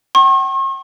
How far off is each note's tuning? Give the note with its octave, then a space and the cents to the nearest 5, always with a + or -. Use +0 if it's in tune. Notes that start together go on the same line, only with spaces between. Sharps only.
G5 -40 C#6 -45